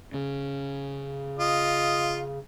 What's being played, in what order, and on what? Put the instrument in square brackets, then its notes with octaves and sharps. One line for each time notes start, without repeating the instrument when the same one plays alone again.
[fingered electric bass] C#3
[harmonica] F4 D#5